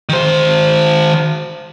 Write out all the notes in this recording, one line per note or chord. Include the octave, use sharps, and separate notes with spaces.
D#3 C5